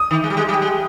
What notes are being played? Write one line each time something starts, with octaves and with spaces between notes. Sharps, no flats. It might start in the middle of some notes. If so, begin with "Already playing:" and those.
Already playing: D#6
D#3
G#3
G3
G#3
G3
G#3